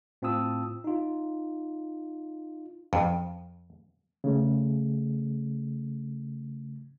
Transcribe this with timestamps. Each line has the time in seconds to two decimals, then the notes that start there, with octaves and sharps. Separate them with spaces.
0.22 A2 C4 F4 A5 D#6 E6
0.84 D#4 F4
2.93 F2
4.24 C#3 A3